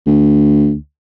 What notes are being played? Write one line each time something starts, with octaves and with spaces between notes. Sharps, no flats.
D2